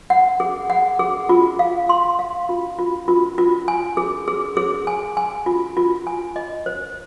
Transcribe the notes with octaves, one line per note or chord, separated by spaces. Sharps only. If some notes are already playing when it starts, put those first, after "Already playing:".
F#5
G#4
F#5
G#4
F4
F5
C6
F5
F4
F4
F4
F4
G#5
G#4
G#4
G#4
G#5
G#5
F4
F4
G#5
D#5
C5